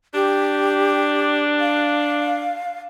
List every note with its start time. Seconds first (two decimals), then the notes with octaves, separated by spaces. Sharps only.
0.14 D4 G4
1.60 F5